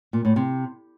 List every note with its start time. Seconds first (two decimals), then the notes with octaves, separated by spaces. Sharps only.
0.13 A#2
0.25 A2
0.36 C3